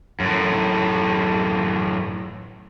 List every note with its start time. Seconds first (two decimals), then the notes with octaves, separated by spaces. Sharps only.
0.20 F#2 A2